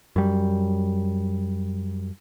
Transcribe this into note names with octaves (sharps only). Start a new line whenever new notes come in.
F#2 G3